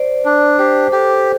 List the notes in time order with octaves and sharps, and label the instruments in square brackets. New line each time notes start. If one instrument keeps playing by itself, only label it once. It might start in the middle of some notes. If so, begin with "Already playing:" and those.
Already playing: [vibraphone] C5 D5
[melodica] D4
[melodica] G4 [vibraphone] C5
[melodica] G4 [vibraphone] A4